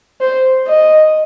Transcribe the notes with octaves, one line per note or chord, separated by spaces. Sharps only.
C5
D#5